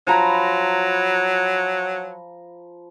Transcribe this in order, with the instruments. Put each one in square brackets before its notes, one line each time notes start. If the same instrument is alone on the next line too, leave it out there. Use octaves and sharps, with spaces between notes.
[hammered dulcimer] F3 A#5 B5 [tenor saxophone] F#3